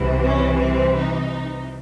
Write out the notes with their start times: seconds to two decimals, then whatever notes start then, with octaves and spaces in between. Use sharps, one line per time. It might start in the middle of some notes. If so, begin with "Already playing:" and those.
Already playing: C2 C3 E3
0.25 C#4
0.60 C4
0.95 D#4